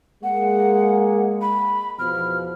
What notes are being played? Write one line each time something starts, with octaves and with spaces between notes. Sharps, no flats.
G#3 A#3 F#5
B5
E2 B2 F3 F6